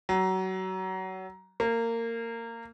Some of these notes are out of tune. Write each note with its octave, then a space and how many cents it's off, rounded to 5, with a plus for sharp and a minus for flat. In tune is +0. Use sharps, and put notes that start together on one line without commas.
F#3 +25
A#3 -20